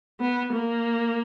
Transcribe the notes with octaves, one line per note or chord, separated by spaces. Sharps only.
B3
A#3